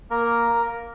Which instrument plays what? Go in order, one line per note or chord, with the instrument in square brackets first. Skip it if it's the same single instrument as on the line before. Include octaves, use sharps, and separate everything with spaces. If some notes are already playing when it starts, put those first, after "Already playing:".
[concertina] A#3 A#4